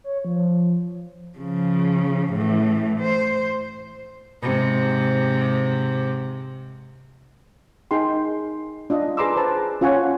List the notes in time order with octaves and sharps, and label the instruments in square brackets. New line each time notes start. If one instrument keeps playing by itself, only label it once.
[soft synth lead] C#5
F3
[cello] C#3 F3
A2 E3
C5
G#2 C3
[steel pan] D#4 G#4 G5 C6
D4 F4 D#5
G#4 B4 A#5 C6 D6 E6
B4 C5 A5
C#4 F4 C#5 F#5 G#5